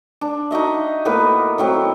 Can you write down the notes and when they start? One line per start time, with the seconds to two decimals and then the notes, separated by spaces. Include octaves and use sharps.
0.21 D4
0.51 D#4 F#4 D#5 E5
1.05 A2 A#3 B3 B4
1.58 A2 F#3 C4